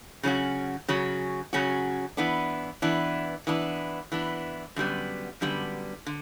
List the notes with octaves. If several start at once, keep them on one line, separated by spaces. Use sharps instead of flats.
C#3 F#3 C#4 F#4
C#3 F#3 C#4 F#4
C#3 F#3 C#4 F#4
E3 B3 D4
E3 B3 D4
E3 B3 D4
E3 B3 D4
F#2 D3 G3 B3
F#2 D3 G3 B3
D3